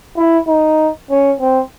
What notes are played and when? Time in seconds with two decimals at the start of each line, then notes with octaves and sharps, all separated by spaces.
0.17 E4
0.47 D#4
1.10 C#4
1.40 C4